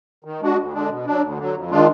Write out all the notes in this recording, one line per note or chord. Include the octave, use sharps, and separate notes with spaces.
D#3
G#3 D4 F#4
D2
D3 G#3 D4
B2
F#3 D4
D2
D3 F#3
F2
D#3 G#3 D4 F4